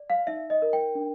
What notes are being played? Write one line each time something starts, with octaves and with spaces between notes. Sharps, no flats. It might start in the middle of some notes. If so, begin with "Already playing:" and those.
Already playing: D5
F5
D#4 E5
D#5
A#4
G5
D4